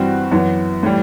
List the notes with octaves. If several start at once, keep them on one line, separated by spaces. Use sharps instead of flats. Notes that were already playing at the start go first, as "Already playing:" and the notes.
Already playing: G2 E3 G3 C4 F#4
F#2 E3 B3
A2 E3 G3